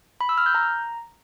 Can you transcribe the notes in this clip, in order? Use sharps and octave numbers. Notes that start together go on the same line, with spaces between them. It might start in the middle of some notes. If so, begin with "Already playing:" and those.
B5
E6
F6
G6
A#5